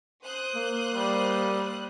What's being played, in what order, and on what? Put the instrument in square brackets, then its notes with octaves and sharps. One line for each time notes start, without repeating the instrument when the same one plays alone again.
[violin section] C5 D#6 F#6
[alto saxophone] A#3
[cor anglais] G3